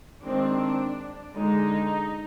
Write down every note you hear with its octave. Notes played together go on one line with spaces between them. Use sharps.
D#3 G#3 C4 D4
D3 G#3 D4 D#4